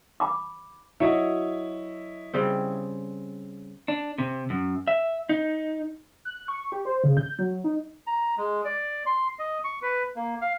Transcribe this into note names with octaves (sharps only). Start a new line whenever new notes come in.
B5 D6
F#3 E4 C#5 D#5
C#3 G3 C4
D4
C3
F#2
E5
D#4
F#6
C#6
G4
C5
C#3
G6
F#3
D#4
A#5
G#3
D5
C6
D#5
C#6
B4
A#3
F5